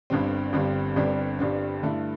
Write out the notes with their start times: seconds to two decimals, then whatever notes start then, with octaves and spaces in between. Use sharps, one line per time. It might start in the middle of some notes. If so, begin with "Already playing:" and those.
0.10 G1 G2 D3 G3 C4
0.53 G1 G2 D3 G3 C4
0.96 G1 G2 D3 G3 C4
1.39 G1 G2 D3 G3 C4
1.83 G2 D3 A3 E4 A4